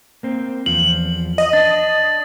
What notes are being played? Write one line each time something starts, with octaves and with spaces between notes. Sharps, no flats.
A#3 C4
E2 F3 F#7
D#5
D4 A6